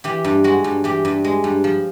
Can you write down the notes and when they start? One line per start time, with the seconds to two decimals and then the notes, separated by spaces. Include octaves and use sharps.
0.04 E3 G4
0.24 G2
0.44 G#3 F#4
0.64 G2
0.84 E3 G4
1.05 G2
1.24 G#3
1.44 G2
1.64 F3